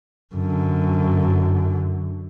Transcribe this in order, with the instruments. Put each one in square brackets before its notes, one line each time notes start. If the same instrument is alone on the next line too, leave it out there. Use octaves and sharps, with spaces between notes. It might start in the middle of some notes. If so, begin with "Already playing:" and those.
[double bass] F#2 D3